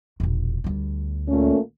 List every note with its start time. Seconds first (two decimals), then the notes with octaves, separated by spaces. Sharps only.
0.20 E1 A#1
0.64 D2 G3
1.29 A#2 A3 C#4